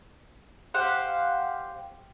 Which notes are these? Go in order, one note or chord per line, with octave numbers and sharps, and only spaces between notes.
G4 C5 F5 F#5